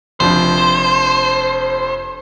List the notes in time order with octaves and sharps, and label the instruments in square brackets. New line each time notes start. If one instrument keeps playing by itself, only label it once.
[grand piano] F1 F3 D4 [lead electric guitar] C5